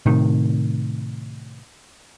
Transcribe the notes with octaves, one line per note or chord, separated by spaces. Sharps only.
A2 C3 D#3